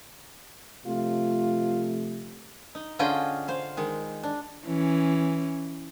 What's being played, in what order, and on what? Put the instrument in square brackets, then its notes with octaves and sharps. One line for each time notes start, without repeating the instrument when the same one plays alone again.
[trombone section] C3 F3 A3 [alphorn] F4
[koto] D#4
D3 C#4 F4 G#4 D#5 G5
C5 F5
D#3 G#3
D4
[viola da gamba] E3 C#4